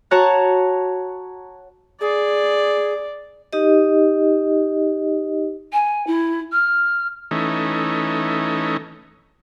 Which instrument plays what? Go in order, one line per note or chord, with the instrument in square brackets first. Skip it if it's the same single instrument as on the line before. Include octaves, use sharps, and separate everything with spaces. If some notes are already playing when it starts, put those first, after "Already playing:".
[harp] F#4 C#5 A5 A#5 F#6
[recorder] G#4 [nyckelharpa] D5
[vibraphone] D#4 G4 D#5
[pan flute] G#5
E4
F6
[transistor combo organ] E3 A3 C#4 D#4